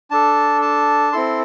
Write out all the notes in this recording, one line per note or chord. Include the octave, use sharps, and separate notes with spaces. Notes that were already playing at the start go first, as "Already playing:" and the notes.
D4 A4 A5
A5
C4 E4 A4 C6